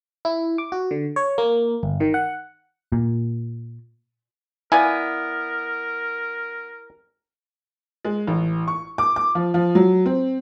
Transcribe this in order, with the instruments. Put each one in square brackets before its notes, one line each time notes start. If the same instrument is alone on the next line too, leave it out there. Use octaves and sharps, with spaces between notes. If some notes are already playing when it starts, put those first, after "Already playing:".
[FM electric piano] E4
D6
F#4
D3
C#5
A#3
G1
D#3
F#5
[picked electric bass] A#2
[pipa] B3 F5 G#5 [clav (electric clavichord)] E4 D5 [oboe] A#4
[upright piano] G#3
A1
C#6
D6
D6
F3
F3
F#3
C4